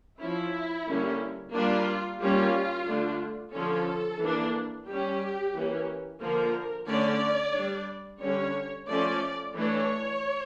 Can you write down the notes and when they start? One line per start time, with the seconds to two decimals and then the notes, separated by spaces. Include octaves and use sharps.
0.20 F3 C#4 E4
0.88 D3 G3 A#3 C#4
1.54 G3 A#3 D4 F4
2.21 G3 A#3 C#4 F4
2.88 D3 A3 D4
3.54 D3 F3 C#4 A4
4.21 E3 A#3 D4
4.87 G3 C#4 G4
5.55 E3 A#3 C#4
6.20 D3 F3 A#3 A#4
6.87 D3 A3 C#4 D5
7.54 G3 D4
8.21 D3 G3 C#4 C#5
8.88 F3 A3 C#4 D5
9.54 E3 A3 D4 C#5